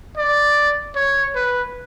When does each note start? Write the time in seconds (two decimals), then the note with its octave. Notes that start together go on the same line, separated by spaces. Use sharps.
0.17 D5
0.95 C#5
1.35 B4